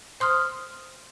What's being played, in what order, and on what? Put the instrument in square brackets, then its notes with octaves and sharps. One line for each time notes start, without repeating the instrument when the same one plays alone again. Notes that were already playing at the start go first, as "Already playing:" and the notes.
[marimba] C5 C6 D#6 F6